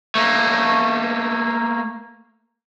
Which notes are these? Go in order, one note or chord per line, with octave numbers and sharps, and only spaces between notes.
A3 A#3